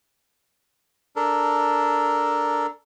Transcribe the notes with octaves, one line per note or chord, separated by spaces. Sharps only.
D4 A4 A#4